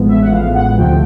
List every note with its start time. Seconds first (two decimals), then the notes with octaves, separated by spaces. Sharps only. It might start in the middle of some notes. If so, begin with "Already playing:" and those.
Already playing: A1 A2 F3 G#3 B3
0.09 E5
0.22 F#5
0.32 F5
0.55 F#5
0.78 D2 C3 F3 A3 G5